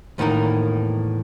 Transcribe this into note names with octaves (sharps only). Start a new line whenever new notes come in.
E2 A2 D#3 A#3 A#4